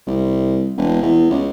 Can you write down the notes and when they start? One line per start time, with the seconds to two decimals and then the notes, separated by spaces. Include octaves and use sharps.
0.07 C2
0.77 E1
1.03 E2
1.31 C#2